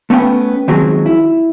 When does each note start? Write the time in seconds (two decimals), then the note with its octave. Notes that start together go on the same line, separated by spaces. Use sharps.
0.10 A3 B3 C#4 F#5 G5
0.68 D#3 F3 F#3 G#3 C4
1.06 E4